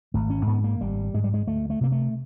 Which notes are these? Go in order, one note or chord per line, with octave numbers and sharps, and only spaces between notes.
G#1 A3
C#4
G#2 B3
A#3
G#1 G3
G#2 G#3
G3
G#3
D2 A3
A3
C3 A#3
A3